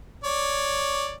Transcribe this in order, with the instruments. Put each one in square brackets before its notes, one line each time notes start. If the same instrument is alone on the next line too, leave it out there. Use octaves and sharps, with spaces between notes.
[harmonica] C#5 D5